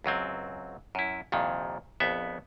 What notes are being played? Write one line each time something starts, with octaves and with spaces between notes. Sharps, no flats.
C#2 F#2 F#3 C4
F#2 E4
C2 F2 A#2 D#3
A#1 F2 B3 E5